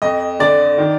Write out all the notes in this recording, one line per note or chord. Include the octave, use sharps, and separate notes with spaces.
F2 D#5
D3 D5
D#3